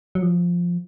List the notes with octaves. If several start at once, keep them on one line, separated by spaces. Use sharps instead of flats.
F#3
F3